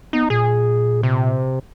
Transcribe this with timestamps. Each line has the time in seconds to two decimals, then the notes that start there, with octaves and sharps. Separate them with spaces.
0.13 B3 D#4
0.30 A#2 G#4
1.03 C3